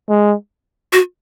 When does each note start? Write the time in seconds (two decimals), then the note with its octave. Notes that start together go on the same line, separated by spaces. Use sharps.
0.09 G#3
0.93 F#4